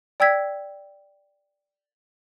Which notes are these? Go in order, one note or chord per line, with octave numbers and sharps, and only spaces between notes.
D5 G5 E6 G#6 B6